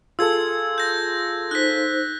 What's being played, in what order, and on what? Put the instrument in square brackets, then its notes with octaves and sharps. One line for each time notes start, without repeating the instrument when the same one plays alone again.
[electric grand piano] F4 G#4 A4 [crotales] E6 G#6
[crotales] G6 A#6
[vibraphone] D#4 C5 [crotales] F#6 B6